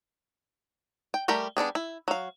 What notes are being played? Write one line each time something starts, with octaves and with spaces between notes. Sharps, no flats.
G5
G3 A3 G4 A#4 B5
G3 B3 D4 G#4
E4
F#3 F5